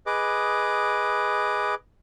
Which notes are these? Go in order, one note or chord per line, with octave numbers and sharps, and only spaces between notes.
G#4 B4 D#5 D6